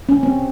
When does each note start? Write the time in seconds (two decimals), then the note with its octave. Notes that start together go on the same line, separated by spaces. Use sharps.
0.09 C#4
0.23 C4